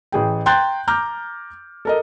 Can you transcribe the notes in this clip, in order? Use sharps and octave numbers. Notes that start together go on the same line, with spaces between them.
A1 G#4 G5
G5 A#5 C6 F#6 G6 A6
A#5 D6 F6 G6
A4 A#4 D#5